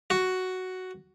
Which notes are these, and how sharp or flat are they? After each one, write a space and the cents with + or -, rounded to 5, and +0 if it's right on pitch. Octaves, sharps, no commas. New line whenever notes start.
F#4 +5